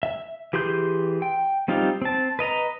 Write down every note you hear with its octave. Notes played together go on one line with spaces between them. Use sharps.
E5
E3 G4 G#4 C6 G6
G5
G3 C4 D#4 F4 G4
C4 A5
B4 D#5 A#5